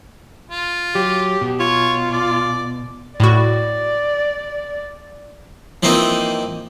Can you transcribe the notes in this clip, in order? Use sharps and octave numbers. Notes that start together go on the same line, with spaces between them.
F4
F#3 G4
B2
F4 C#5
D5
A2 E4 F#4 D5
E3 F3 A#3 C4 D#4